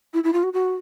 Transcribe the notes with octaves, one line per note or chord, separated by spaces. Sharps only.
E4
E4
F4
F#4
F#4